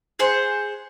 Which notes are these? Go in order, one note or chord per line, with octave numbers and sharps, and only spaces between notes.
G#4 C5 F#5